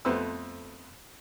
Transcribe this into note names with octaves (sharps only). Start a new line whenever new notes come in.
F2 A3 B3 B4 C5 E6